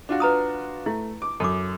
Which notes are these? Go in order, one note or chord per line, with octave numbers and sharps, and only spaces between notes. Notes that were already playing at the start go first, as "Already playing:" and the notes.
D4 F4 F#4
B4 A#5 D#6
A3 E4
D6
F#2 A4 D6